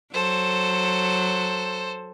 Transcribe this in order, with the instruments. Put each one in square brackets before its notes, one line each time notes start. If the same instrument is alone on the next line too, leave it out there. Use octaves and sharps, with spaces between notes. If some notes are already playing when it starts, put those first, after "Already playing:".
[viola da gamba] F#3 [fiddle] A4 C5